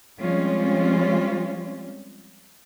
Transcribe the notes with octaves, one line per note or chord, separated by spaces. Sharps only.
F3 G3 G#3 C4 C#4 F4